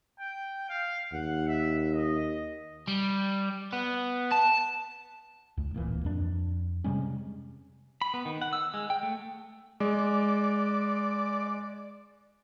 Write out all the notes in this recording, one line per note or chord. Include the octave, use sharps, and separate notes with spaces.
G5
F5
D#2 F#5
E5
D#5
G3
B3
A5
C#2
D1 A#2 E3
F2 D4
C3 G3 G#3 C#4
B5
B3
D#3
F#5
E6
G#3
G5
A3
G#3 D5